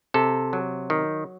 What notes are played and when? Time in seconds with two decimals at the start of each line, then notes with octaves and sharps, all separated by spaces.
0.14 C3 A4
0.53 F#3
0.90 D#3